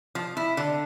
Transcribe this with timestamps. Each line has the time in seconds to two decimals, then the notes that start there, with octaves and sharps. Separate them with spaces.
0.15 F3
0.37 E4
0.57 D3